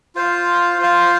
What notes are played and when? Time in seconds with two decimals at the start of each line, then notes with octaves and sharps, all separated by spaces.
0.15 F4 C5 F5
0.78 F4 C5 F5